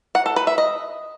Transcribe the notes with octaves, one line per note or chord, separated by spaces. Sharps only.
F#5
A4
B4
E5
D#5